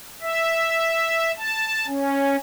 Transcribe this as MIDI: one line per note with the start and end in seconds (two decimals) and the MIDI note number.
0.22 1.32 76
1.37 1.86 81
1.87 2.36 61